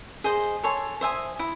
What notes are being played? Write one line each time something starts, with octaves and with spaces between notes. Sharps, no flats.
G#4 C5 D#5
A4 C#5 G#5 C6
C5 E5 G#5 D#6
E4